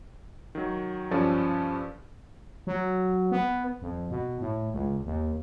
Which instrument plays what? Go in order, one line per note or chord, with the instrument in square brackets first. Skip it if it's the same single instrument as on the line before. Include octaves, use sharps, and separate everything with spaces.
[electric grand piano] D#3 F#3
G2 F3 C#4 A4 D5
[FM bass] F#3
B3
F2
B2
A2
C#2
D#2